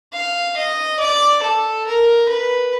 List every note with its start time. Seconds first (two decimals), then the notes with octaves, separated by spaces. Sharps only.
0.13 F5
0.57 D#5
1.00 D5
1.43 A4
1.87 A#4
2.29 B4